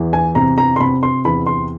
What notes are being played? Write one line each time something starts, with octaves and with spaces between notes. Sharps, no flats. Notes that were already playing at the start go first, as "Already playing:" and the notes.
Already playing: E2 E3
G#5
C3 A#5
A#5
C6
C3 B5
C6
E2 B5
C6